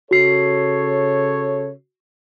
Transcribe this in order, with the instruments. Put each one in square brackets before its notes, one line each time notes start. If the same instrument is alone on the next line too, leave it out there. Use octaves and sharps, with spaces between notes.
[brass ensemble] C#3 A4 C#5 [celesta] F#4 C7